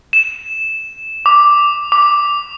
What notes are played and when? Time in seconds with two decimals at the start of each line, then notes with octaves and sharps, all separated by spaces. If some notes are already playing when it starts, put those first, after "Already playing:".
0.13 E7
1.26 D6
1.92 D6